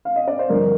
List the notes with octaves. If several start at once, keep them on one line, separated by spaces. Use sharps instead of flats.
F5
D#5
D5
C5
G2 D3 F3 A#4